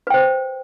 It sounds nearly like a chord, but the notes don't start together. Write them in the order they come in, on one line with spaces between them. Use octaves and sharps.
B4 G5 C5